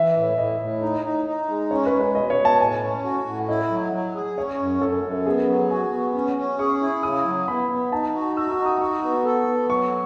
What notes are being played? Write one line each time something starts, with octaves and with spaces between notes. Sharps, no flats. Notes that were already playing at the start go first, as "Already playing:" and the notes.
Already playing: E3 E5
A2
A2 D#5
A2
D#4
D#4
D#4
G#3
C#4 C#5
B4
G#3
B4
B2 D#5
C#5
B2
A5
A2 G#5
C#4
F#4
A2
E4 D#5
F#3
F#3
G#4
C#4 C#5
F#2
F#2 A4
F#2
A4
B3 G#4
F#3
F#4 G#5
B3
C#4
C#4
G#4 C#6
E4
C#3 D#6
F#3
B3 B5
B3
D#4 A5
F#4
F#4 E6
E6
D#4
D#6
F#4 C#6
B3
A4
B3
F#3 C#6